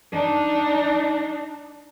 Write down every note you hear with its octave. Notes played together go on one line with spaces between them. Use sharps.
D4 D#4